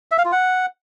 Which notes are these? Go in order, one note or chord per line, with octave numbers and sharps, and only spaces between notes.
E5
F5
F4
F#5